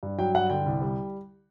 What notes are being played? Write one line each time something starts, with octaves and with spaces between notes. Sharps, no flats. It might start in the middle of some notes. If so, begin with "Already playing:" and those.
G2
F#3 G5
G2 F#5
D3 G5
C2
G3